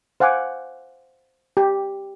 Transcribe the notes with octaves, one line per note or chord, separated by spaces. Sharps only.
C5 F5 F#5 G#5 D6
G4